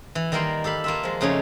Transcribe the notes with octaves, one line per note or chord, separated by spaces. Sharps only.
E3
D#3 G3 A#3 A#4 G5 C6
G4 A4 F5 B5
A#3 F4 E5
F3 G#3
F2 C#3 A3 C#4 D#4 C#5